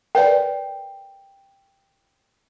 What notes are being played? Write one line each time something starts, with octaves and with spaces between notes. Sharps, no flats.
A#4 B4 D5 G5